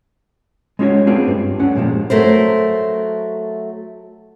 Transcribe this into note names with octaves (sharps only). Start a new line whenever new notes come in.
G#3 C#4 F4 F#4 C#5
A3 B3 C4 D4 F4 G#4
G2
D2 D3 C#4 F#5
G2 A#2 F3 G#3
F#3 A3 A#4 C5